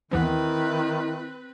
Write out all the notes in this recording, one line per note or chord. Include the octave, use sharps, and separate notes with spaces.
D#2 D#3 E3 B3 C4 E4 B4